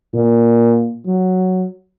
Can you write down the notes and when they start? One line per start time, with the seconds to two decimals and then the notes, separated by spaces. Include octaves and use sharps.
0.14 A#2
1.06 F#3